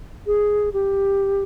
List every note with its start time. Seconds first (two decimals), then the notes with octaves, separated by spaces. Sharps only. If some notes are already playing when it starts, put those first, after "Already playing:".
0.27 G#4
0.73 G4